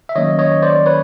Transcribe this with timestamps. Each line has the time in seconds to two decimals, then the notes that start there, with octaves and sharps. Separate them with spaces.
0.09 E5
0.15 D#3 F#3 A#3 C#4 C#5 D#5
0.39 C#5 D#5
0.62 C5 D5
0.86 B4 C#5